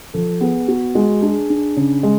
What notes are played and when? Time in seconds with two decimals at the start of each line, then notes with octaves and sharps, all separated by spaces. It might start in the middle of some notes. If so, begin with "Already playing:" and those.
0.14 F3 A4
0.41 B3 G#4
0.68 B3 F#4
0.95 G#3 F#4
1.22 D4 G#4
1.50 D4
1.77 C#3
2.03 G#3